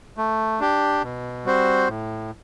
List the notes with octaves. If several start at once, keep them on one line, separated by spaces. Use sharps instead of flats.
A3
D4 G4
B2
G3 C4 F#4 C5
A2